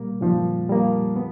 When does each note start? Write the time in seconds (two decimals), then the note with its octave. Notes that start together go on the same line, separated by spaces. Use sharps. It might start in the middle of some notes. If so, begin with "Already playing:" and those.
Already playing: A#2 G3 A#3
0.21 A#2 F3
0.69 G3 A#3
1.16 B3